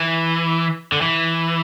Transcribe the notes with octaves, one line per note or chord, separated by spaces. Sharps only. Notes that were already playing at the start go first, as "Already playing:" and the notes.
Already playing: E3
D3
E3